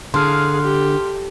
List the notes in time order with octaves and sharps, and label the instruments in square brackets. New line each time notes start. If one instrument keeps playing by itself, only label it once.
[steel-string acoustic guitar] D3 [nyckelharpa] G#4 F5 [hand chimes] C6 F6
[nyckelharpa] G4